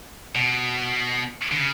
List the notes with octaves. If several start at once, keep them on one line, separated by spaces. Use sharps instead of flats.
B2
D3
C#3